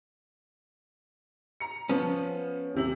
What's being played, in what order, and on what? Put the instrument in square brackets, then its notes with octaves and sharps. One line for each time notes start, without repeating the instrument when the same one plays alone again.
[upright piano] A#5 C#7
[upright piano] F3 [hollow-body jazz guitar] B3 C#4
[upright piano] D#1 C3 F#7